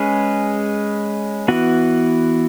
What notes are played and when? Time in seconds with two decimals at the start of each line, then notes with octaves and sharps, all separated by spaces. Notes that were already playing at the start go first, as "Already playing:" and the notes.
Already playing: G#3 C#4 G#4 B4
1.48 E3 B3 F#4